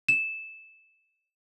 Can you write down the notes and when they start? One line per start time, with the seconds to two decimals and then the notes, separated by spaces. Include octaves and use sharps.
0.08 E7